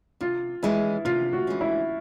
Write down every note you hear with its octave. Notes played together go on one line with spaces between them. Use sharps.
C3 F4
E3 G#3 C#4 E4
C3 F4
F#4
E3 G#3 C#4
E4